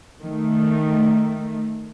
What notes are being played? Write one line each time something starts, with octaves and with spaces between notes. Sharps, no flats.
D#3 A3